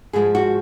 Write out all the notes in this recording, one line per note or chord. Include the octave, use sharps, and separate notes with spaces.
G#2 F3 G#3 G#4
F#4